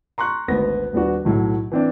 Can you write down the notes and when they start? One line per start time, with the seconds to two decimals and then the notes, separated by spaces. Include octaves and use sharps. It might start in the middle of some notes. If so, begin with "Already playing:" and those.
0.18 A#5 C6 C#6 F#6
0.48 G#1 D2 B3 A#6
0.93 D#1 B3 D4 F#4
1.25 B1 A2 F#3
1.72 E3 C4 D4